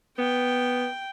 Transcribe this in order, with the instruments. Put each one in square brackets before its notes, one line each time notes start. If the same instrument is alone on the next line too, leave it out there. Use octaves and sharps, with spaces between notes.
[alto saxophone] B3 [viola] G5